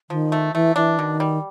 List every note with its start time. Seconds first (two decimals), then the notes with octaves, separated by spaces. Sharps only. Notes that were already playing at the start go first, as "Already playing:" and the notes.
0.10 D#3 F3
0.32 A3
0.54 E3 A3
0.76 E3 D4
0.98 B2 D#3
1.20 G3